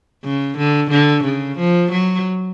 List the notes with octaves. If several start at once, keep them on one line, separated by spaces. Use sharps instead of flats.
C#3
D3
D3
C#3
F3
F#3